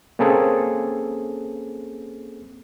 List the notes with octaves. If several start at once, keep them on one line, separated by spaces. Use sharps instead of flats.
A#3 C4 C#4 G#4 A4